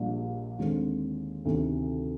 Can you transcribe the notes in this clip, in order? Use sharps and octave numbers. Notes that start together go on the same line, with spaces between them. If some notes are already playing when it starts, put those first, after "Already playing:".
Already playing: A#1 A#2 G3 D4 G4
D#2 D3 G#3 C4
D2 C3 D#3